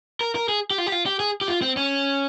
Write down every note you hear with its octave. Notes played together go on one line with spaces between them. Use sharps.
A#4
A#4
G#4
G4
F4
G4
F4
G4
G#4
G4
F4
C4
C#4